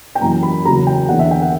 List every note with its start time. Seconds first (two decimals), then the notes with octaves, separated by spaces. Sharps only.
0.15 G5
0.21 F#2 E3 A#3 A#5
0.43 B5
0.65 E2 C#3 F#3 A#3 A#5
0.87 G5
1.09 E2 D3 A#3 F#5
1.19 E5
1.31 G5
1.42 F#5